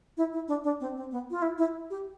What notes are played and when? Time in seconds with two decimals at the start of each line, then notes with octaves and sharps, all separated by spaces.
0.17 E4
0.33 E4
0.48 D4
0.64 D4
0.80 C4
0.96 C4
1.11 B3
1.31 F4
1.42 E4
1.58 E4
1.90 G4